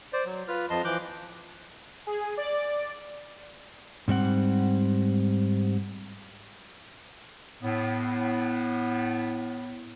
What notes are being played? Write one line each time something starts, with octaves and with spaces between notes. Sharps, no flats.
C5 D5
F#3
F4 B4 F6
F2 F3 D#5 A5 C6
E3 F3 D6 F#6 G6
G#4
D5
G#2 G3 C4 F#5
A2 B3